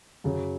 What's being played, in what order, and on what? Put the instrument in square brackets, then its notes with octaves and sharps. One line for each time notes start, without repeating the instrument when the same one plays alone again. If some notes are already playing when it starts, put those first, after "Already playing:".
[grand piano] F#2 C#3 F#3